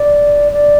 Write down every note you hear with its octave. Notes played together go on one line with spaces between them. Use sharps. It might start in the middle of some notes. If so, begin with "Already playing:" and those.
Already playing: D5
D5